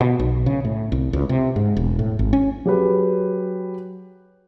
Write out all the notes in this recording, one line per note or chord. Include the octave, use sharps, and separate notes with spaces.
B2
B1
C#3
A2
C2
C#2
C3
G#2
E1
A2
G#1
C#4
F#3 G4 G#4 B4